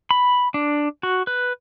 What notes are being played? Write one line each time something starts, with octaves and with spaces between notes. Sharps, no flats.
B5
D4
F#4
B4